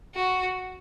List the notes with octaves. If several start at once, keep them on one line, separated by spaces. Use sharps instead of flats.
F#4